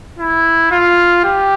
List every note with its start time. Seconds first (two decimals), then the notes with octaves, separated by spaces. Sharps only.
0.19 E4
0.71 F4
1.24 G4